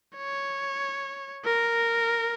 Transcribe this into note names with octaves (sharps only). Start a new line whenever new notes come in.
C#5
A#4